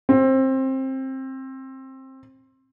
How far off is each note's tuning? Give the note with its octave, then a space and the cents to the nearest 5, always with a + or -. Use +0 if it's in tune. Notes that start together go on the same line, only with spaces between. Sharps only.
C4 +20